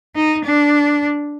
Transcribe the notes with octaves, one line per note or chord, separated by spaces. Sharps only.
D#4
D4